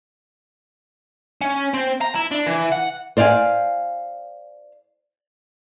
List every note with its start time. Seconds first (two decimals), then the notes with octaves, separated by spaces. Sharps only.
1.41 C#4
1.74 C4
2.01 A#5
2.15 E4
2.31 D4
2.46 E3
2.72 F#5
3.17 C5 D5 F5 F#5 G#5